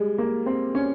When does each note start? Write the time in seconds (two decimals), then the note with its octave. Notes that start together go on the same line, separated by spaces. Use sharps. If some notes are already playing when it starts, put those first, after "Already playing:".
Already playing: G3 G#3
0.18 A#3
0.46 C4
0.75 C#4